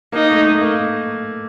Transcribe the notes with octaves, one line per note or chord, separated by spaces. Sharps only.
A#3 D#4
A3
A3
A#3